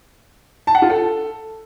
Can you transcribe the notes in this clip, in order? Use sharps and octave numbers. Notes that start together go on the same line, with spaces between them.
A5
F#5
F4
A4